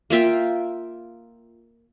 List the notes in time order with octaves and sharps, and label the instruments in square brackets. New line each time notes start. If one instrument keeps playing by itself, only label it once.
[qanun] A#3 F4 E5 G5